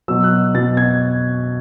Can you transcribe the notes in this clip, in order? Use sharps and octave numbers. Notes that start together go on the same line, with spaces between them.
B2 F#3 E6
F#6
B2 F#3 A6
G#6